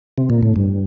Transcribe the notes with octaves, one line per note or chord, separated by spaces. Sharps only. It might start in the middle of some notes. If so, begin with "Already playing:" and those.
C3
A#2
A2
G2